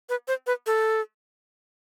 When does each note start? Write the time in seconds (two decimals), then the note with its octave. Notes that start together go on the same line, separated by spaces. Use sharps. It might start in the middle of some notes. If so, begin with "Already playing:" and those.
0.09 B4
0.28 C5
0.47 B4
0.66 A4